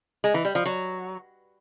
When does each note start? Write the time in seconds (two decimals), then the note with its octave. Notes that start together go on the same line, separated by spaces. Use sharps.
0.24 G#3
0.34 E3
0.45 G3
0.55 F3
0.66 F#3